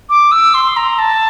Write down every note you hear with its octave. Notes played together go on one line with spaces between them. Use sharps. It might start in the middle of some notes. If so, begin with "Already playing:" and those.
D6
E6
C6
A#5
A5